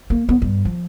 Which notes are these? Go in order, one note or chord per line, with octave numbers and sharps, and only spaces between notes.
A#3
B3
G2
F3